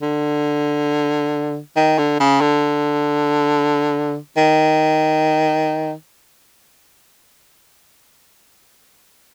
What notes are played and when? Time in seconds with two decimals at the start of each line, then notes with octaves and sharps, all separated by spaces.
0.02 D3
1.76 D#3
1.98 D3
2.20 C#3
2.41 D3
4.37 D#3